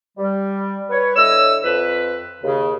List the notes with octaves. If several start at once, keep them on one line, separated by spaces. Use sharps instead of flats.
G3
B4 C#5
D3 E4 C#5 D#5 E6
F2 B4
D#2 C#3